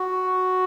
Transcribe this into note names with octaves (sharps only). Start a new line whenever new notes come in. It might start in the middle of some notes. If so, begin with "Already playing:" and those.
Already playing: F#4